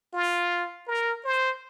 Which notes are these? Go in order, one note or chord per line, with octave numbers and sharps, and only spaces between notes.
F4
A#4
C5